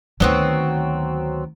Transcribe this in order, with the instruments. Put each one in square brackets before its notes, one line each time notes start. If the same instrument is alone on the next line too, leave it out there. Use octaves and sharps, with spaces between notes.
[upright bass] D2 D#3 [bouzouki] F#3 B3 C4